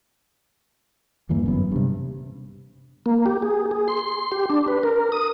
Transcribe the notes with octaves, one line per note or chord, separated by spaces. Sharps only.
E2 G2 E3 A#3
G1 F#2 B3
G2 C3
A#3
G4
G#4
G#4
C6
G4
D4
B4
A#4
D#6